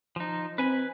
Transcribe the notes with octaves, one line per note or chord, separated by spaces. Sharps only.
F3 D#4
C4 B4 G#5 B5